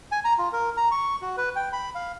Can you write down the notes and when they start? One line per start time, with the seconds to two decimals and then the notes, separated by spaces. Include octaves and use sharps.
0.12 G#5
0.24 A#5
0.38 F4
0.53 A#4
0.77 A#5
0.91 C#6
1.22 F#4
1.37 B4
1.56 G5
1.73 B5
1.95 F5